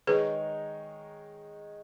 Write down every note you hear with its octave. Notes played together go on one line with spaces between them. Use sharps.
D#3 G#3 D#4 G#4 A#4 B4 C#5